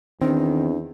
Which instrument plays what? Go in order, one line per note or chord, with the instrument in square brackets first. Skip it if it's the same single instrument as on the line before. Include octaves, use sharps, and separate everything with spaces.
[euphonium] E2 [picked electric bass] D#3 [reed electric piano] C4 [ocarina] D4